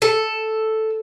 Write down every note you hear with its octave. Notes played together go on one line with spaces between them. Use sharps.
A4